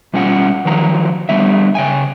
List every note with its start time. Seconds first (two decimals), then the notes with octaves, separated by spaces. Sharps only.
0.14 B2 G3 C#4 F4 F#5
0.65 D#3 F3 F#3 A#5
1.29 D3 G3 B3 E5
1.75 C#3 G5 G#5